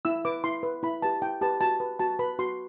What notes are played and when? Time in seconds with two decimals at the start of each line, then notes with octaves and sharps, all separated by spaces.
0.05 E4 E6
0.25 B4 D6
0.44 E4 C6
0.63 B4
0.83 E4 B5
1.02 G4 B4 A5
1.22 E4 G5
1.41 G4 B4 A5
1.61 F#4 A5
1.80 B4
1.99 F#4 A5
2.19 B4 B5
2.39 F#4 C6